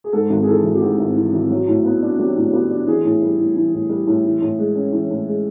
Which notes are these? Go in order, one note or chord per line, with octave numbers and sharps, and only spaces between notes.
G#4
G#2 A4
G#1
G#4
E3 A4
G#1
G4
G#2 G#4
G#1
E3
G#1
F#3
A2
B3
D4
F#3 G4
A2
B3 G4
D4
E3 G#4
A2
G3
A2
E3
A2
G3
A2
E3
A2
G#3
C#4
E3
A2
G#3